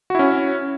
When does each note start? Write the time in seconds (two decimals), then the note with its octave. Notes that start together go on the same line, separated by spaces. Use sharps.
0.10 F#4
0.15 E4
0.19 C#4